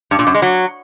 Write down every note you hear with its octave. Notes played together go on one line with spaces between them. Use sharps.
G2
A#2
F#2
G#3
F#3